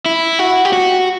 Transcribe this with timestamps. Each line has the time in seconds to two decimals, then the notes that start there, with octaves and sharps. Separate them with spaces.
0.06 E4
0.39 F#4
0.65 G4
0.73 F#4